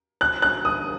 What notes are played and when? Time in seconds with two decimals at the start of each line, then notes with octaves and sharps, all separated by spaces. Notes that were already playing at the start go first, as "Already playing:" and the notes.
0.21 F#6
0.42 F#6
0.65 D#6